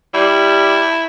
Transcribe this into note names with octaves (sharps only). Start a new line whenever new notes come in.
G3 E4